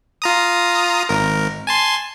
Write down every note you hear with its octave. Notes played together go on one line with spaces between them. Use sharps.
F4 A#5 D#6
G#1 A#4
G#5 A5 C6